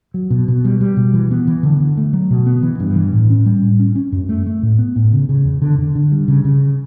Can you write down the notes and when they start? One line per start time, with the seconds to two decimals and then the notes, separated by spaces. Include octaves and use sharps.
0.14 F#3
0.30 B2
0.48 B2
0.65 G3
0.81 G3
0.97 B2
1.14 E3
1.31 B3
1.47 E3
1.63 D3
1.80 D3
1.97 A3
2.13 F#3
2.31 B2
2.46 B3
2.63 E3
2.80 G2
2.96 E3
3.13 A2
3.30 C#4
3.46 G3
3.63 A2
3.80 C#4
3.96 C#4
4.12 F#2
4.29 A3
4.46 A3
4.63 A2
4.79 B3
4.96 A2
5.13 C#3
5.29 C#3
5.45 E2
5.62 D3
5.79 D3
5.95 D3
6.12 G3
6.28 C#3
6.44 C#3